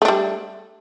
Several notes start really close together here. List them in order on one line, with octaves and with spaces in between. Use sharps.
A3 D4 G3